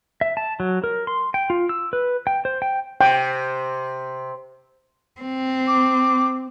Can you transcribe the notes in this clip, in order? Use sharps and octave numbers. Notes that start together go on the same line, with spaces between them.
E5
A5
F#3
A#4
C6
G5
F4
E6
B4
G5
C5
G5
C3 G5
C4
D6